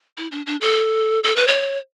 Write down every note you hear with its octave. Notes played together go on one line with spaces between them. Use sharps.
E4
D4
D4
A4
A4
B4
C#5